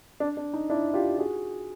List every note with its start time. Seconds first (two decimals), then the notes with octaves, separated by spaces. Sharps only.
0.20 D4
0.37 D4
0.54 D#4
0.70 D4 E4
0.94 F4 G4
1.18 F#4 G#4